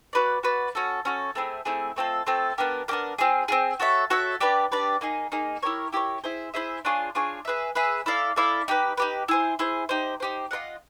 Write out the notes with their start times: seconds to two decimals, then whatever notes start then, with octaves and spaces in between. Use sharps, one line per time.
0.13 F#4 B4 D5
0.43 F#4 B4 D5
0.75 C#4 F#4 A4
1.05 C#4 F#4 A4
1.35 A3 C4 E4 G#4
1.65 A3 C4 E4 G#4
1.96 A3 C4 F4 A4
2.26 A3 C4 F4 A4
2.58 B3 D4 G4 A#4
2.88 B3 D4 G4 A#4
3.18 C4 F4 G#4
3.48 C4 F4 G#4
3.80 F#4 A4 C#5 E5
4.10 F#4 A4 C#5 E5
4.40 D4 G4 B4 D5
4.72 D4 G4 B4 D5
5.01 A#3 D#4 G#4
5.32 A#3 D#4 G#4
5.62 E4 G4 A#4 C#5
5.93 E4 G4 A#4 C#5
6.24 E4 G#4 C5 E5
6.54 E4 G#4 C5 E5
6.85 D4 F4 G#4 C#5
7.15 D4 F4 G#4 C#5
7.45 G#4 B4 E5
7.75 G#4 B4 E5
8.06 E4 A4 D5 F5
8.36 E4 A4 D5 F5
8.68 D#4 G4 B4
8.97 D#4 G4 B4
9.28 E4 G#4 C5
9.59 E4 G#4 C5
9.89 D#4 G4 C5
10.20 D#4 G4 C5
10.51 F4 A#4 D#5 F#5